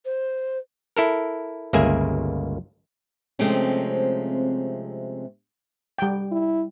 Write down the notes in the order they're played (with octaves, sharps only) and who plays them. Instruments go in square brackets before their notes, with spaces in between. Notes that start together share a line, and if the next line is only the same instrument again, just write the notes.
[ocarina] C5
[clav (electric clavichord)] E4 A4 A#4
G1 C#2 A#3 G#4 E5 G#5
[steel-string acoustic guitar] C3 F3 G#3 A3 C4 C#4
[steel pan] G3 G5
[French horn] E4